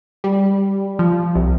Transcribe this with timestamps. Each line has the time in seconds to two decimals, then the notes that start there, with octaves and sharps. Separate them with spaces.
0.24 G3
0.99 F3
1.35 C2